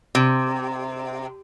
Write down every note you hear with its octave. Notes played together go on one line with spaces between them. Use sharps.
C3